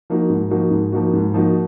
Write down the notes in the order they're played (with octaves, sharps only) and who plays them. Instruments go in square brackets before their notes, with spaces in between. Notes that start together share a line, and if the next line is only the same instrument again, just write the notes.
[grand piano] F3 A#3 D#4 F#4
G#2
F3 A#3 D#4 F#4
G#2
F3 A#3 D#4 F#4
G#2
F3 A#3 D#4 F#4